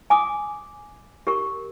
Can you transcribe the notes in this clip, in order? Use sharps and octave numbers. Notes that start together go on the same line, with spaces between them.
G#5 D6 D#6
G4 A#4 C#6